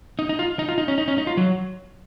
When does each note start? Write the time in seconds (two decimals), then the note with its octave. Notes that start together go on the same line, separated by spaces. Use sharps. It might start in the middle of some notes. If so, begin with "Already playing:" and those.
0.19 D#4
0.29 D#4
0.39 F4
0.59 D#4
0.69 F4
0.78 D#4
0.88 C#4
0.98 D#4
1.08 C#4
1.18 D#4
1.27 F4
1.37 F#3